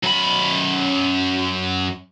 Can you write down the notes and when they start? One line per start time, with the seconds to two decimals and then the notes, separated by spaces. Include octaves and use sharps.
0.03 F#2 B5